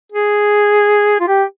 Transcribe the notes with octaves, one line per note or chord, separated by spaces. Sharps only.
G#4
F4
G4